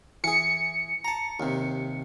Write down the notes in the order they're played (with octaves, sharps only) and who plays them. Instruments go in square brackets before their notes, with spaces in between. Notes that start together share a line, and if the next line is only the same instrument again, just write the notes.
[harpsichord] E3 G#4 [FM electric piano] C#7
[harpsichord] A5 A#5
D#2 C3